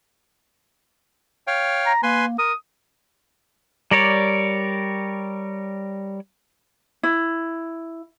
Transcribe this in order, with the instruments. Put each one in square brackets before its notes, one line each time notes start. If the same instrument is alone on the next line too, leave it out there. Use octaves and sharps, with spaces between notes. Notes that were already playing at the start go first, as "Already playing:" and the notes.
[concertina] C#5 F5 G5
[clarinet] A#5
[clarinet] A#3 [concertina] B4 G#5 C6
[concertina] A#4 [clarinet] D#6
[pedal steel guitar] G3 A#4 C#5 D5
[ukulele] E4